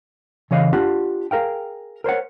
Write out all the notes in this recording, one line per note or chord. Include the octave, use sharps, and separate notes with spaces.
C#3 E3 C#5 D#5 F5
D4 F4 G4 F#5
G#4 A#4 F5 G5
A#4 C5 C#5 F#5